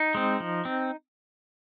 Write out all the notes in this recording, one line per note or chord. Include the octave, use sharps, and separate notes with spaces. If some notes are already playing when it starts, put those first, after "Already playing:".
Already playing: D#4
G#3 C4
F3
C4